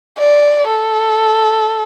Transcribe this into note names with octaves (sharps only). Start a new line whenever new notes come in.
D5
A4